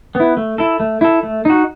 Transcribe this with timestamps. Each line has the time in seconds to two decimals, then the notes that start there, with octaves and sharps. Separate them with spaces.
0.15 B3 E4
0.37 A3
0.58 E4 A4
0.80 A3
1.01 E4 A4
1.23 A3
1.45 D#4 F#4